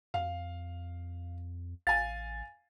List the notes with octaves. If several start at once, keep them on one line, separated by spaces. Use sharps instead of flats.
F2 F5
A1 F5 G#5 A6